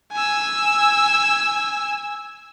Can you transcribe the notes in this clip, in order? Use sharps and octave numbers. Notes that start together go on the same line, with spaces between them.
G#5 E6